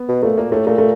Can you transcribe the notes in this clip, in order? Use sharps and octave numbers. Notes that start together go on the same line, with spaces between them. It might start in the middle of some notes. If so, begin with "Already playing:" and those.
Already playing: B3
B2
A#2 A3
A#2 A#3
A2 A3
A#2 A3
A3